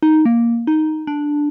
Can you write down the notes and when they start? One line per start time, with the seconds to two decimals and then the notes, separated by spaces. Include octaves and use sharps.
0.03 D#4
0.25 A#3
0.67 D#4
1.07 D4